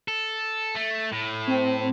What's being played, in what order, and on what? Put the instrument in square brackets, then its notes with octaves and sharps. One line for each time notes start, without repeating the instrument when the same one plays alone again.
[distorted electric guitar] A4
A3
A2
[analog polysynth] C4